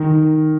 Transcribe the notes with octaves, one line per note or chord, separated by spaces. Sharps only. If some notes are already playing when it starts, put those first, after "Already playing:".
Already playing: D#3